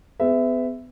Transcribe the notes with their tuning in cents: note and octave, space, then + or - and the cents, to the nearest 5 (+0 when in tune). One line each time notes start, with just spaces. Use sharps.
B3 +35 G#4 +0 E5 +0